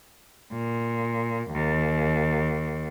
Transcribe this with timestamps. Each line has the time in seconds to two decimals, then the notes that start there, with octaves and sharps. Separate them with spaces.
0.53 A#2
1.48 D#2